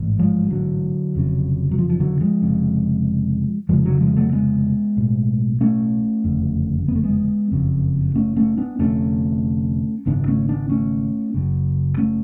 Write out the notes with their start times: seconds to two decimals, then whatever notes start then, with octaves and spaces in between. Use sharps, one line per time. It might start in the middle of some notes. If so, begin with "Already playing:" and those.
Already playing: A1 G#2
0.19 F3 G#3
0.50 D3 F#3
1.15 F1 F2 C#3
1.71 F#3
1.78 F3
1.89 F3
2.00 D3 F#3
2.21 F3 G#3
2.42 F1 F2 C#3
3.69 F1 F2 C#3 F3 G#3
3.85 D3 F#3
4.01 F3 G#3
4.16 F#3 A3
4.33 G#3 B3
4.97 B1 A2
5.61 A3 C#4
6.24 F#1 F2 D3
6.88 B3
6.95 A3
7.04 G#3 B3
7.52 F#1 F2 C#3
8.15 A3 C#4
8.36 A3 C#4
8.57 B3 D4
8.79 F1 F2 D3 A3 C#4
10.06 G#1 F#2 C#3 B3 D4
10.27 A3 C#4
10.49 B3 D4
10.69 A3 C#4
11.34 F#1 F#2 C#3
11.98 A3 C#4